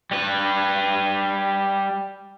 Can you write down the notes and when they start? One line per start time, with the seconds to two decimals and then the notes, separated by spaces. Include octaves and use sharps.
0.11 G3 B4